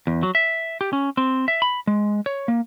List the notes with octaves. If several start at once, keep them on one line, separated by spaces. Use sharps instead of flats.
E2
F#3
E5
G4
C#4
C4
E5
B5
G#3
C#5
A#3